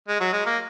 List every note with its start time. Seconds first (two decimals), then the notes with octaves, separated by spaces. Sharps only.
0.08 G#3
0.21 F#3
0.33 G#3
0.46 A#3